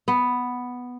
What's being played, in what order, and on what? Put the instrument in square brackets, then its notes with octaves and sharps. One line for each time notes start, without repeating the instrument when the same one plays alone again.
[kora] B3